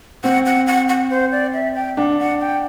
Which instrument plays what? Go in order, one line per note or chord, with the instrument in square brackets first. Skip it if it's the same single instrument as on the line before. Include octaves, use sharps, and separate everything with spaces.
[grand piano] C4 [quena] F#5
[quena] F#5
F#5
F#5
C5
D5
E5
G5
[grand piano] D4 [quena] F#5
[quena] F#5
G5